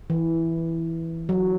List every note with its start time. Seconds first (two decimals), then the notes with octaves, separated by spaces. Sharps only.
0.10 E3
1.29 F#3